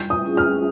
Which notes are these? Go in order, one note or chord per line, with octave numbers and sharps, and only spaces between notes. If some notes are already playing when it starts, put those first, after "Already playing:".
Already playing: G3 G6
D#6
C#4 F4 G#4
F6